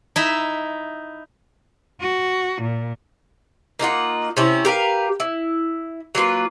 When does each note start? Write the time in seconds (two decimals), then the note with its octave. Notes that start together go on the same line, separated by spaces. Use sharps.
0.16 D#4 E4 E5
2.01 F#4
2.62 A#2
3.79 A#3 D#4 F4 F#5
4.37 C3 C#4 E4
4.65 G4 A#4 B4 F5
5.20 E4
6.15 F#3 A#3 F4 B4